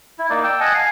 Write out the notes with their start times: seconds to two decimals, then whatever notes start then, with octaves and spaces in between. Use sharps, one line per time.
0.19 E4
0.30 A#3 D#4 D5
0.44 G5 E6
0.60 D#5 F#5 G#5 A5
0.74 F5 G#5